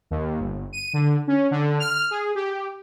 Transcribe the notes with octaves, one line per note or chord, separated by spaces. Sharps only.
D#2
G1
D#7
D3
C#4
D3
F6
G#4
G4